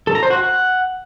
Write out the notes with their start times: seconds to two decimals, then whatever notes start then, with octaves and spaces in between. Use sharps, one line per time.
0.07 A4
0.15 A#5
0.23 C5
0.30 F#4
0.38 F#5